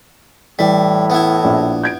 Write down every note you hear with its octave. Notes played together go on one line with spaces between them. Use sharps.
A2 E3 G3 B6
B3 E4
A#1 F4 D5
G6 G#6 D7